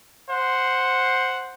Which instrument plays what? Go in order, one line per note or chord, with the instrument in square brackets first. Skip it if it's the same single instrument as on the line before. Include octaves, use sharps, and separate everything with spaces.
[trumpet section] C5 F#5